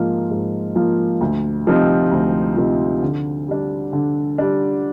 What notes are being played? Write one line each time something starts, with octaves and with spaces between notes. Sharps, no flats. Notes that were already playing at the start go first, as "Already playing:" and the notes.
Already playing: G#2 F3 A#3 F4
G#2
F3 A#3 F4
D2
C3 F3 C4 D#4
D2
C3 F3 C4 D#4
D3
G3 D4
D3
G3 D4